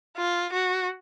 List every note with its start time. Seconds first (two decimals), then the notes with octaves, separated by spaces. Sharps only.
0.17 F4
0.52 F#4